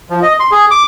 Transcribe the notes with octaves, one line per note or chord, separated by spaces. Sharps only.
F3
D#5
C6
G#4
D6